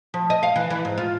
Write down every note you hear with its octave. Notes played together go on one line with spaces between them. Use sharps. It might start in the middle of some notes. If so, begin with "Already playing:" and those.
F3
D#5
F5
E3
E3
G#2
F4